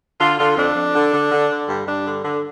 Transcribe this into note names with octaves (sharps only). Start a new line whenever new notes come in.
D3 F4
D3 F4
F2 D4
F2
D3
D3
D3
D3
G2
G2 D4
D3
D3